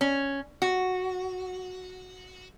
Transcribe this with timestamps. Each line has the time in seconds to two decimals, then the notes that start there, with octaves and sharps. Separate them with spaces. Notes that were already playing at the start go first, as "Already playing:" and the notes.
0.01 C#4
0.62 F#4